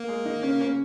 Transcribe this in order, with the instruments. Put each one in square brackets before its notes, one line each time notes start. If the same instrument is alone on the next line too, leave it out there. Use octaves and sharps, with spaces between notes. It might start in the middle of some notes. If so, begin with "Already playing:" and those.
Already playing: [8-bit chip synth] A#3
[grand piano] G#3 G#4
D#3 D#4
C#3 C#4
C#3 C#4